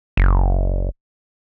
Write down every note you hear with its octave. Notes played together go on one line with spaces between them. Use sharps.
F#1